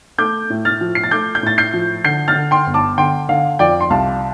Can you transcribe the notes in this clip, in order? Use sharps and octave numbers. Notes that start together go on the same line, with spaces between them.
A3 D6 G6
A2
F6 A6
F3
C7
A6
A3 D6 G6
G6
A2 A6
G6 C7
F3
D3 G6 C7
F6 A6
D3
G5 C6
G1
A5 D6
D3 G5 C6
D3 F5
F2 D5 G5
C6
C2 F5 A5